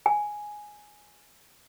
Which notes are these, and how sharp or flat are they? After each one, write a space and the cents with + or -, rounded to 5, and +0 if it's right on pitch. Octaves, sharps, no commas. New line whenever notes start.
G#5 +5